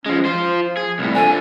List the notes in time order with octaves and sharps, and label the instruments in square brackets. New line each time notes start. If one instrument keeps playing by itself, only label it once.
[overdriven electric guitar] F3 G#3 [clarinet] C#4
[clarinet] F3 [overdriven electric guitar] F4 C5
[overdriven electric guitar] G#4
C2 A2
[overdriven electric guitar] F3 D4 [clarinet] A4 [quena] G#5